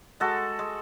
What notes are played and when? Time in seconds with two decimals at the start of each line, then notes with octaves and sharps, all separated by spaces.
0.20 G#3 F#4 A4
0.59 G#3